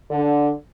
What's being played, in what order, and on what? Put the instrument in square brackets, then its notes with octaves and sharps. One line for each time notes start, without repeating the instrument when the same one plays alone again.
[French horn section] D3